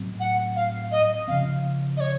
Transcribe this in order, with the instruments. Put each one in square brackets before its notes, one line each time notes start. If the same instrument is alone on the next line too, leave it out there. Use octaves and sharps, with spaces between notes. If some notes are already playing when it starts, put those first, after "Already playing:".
Already playing: [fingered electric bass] A2 F#3 C4
[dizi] F#5
F5
D#5
[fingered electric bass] C#3 F3 C4 [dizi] F5
[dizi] D#5
C#5